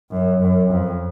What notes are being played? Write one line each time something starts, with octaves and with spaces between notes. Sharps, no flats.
F#2
F#2
F2